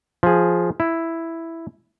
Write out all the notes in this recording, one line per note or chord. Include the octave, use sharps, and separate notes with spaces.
F3 G#4
E4